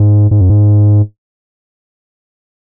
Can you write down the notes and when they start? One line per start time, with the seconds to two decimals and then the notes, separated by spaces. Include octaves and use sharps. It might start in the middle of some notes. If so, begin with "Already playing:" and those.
Already playing: G#2
0.31 G#2
0.41 F#2
0.50 G#2